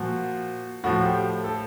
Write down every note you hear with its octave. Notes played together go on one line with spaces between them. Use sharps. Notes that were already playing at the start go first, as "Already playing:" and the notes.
Already playing: A#2 F3 F#4
A2 F3 F#4
G4
A4